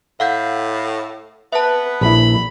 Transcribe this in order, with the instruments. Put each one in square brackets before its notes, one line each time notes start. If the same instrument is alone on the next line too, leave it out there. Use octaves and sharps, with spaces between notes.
[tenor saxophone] A2 [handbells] F5 F#5 G6
[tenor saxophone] B3 [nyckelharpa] B4 [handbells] E5 A5
[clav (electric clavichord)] A#1 E4 [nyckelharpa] B5